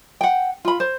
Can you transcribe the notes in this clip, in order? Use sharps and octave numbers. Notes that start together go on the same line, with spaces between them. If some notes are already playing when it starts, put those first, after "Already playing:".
F#5 G5
F4 B5
C5